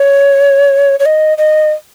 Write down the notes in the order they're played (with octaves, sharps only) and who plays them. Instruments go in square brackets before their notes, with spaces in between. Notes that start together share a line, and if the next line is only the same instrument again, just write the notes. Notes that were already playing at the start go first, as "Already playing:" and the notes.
Already playing: [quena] C#5
C#5
D#5
D#5